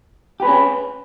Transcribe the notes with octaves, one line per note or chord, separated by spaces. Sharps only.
C#4 G4 G#4 B4